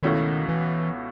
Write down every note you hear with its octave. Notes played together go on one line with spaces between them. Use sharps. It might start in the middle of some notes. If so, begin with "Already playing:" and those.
C#2 B2 D#3 A3 C#4 E4
E3